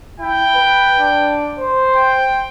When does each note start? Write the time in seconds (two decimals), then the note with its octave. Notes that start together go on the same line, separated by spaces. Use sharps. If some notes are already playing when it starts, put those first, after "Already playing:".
0.20 E4 G5
0.55 B4
1.00 D4
1.59 C5
1.96 G5